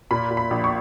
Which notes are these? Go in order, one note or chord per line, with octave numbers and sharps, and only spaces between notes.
A#2 B5
A#2
B5
A#1
C#6